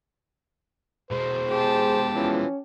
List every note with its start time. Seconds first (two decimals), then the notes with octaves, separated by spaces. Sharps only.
1.11 B2 G#3 C5
1.50 G4 G#4 A5
2.15 E3 F3 C#4